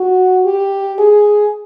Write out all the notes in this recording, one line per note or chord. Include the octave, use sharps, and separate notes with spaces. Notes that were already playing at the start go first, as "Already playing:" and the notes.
Already playing: F#4
G4
G#4